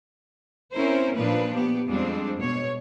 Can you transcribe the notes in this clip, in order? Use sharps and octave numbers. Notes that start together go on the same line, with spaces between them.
C4 C#4 E4 A#4 C5
A#2 F3 A#3 D4 B4
B3 G4
F2 G3 G#3 C4 D4
B2 C#5